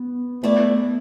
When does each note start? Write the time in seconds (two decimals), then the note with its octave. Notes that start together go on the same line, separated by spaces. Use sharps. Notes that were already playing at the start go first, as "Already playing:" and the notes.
Already playing: B3
0.43 A3 B3 E4 D5